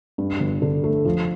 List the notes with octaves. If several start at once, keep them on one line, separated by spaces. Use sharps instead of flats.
G2
G1
D3
A3
F3